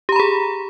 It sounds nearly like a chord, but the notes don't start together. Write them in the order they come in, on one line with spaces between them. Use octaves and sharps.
G4 A#5 B5 G#4